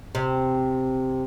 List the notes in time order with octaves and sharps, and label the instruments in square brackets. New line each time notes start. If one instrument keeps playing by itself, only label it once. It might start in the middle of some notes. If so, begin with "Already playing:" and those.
[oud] C3